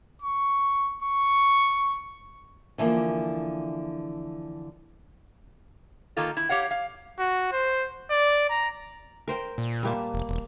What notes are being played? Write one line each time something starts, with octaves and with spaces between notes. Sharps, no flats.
C#6
C#6
D3 E3 F3 A#3
D#3 A#3 F4 A4
E4
G4 C#5 F5 F#5
F5
F#4
C5
D5
A#5
A#4 C5 G5
A#2
G3 A#3 A5
F1
E1